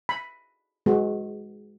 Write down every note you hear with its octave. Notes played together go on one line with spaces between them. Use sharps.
B5
G#3 B3 F#4